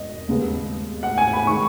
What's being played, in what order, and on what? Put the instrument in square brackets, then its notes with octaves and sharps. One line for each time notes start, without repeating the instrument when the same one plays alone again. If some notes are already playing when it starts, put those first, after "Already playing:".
Already playing: [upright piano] E1 D#5
D#2 C#3 G#3 B3
F#5
G#5
B5
D#3 G#3 C#6